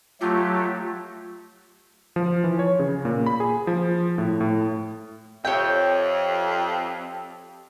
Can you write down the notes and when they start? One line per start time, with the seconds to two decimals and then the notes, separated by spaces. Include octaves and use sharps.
0.21 F#3 A3 F4 G4
2.16 F3
2.44 E3
2.59 C#5
2.79 C#3
3.05 A#2
3.26 B5
3.40 G#4
3.67 F3
4.18 A2
4.41 A2
5.45 F2 G4 C#5 E5 G5